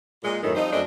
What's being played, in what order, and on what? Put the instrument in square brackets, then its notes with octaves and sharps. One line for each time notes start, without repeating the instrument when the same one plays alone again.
[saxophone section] A#2 G#3
F#2 A2 D#3
F3 G3 C4 D#4
F#2 A3 C4 D4 D#5